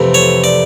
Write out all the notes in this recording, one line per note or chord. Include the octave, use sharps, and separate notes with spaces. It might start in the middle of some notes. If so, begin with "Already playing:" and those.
Already playing: F2 C3 E3 A3 C4
C#5
D5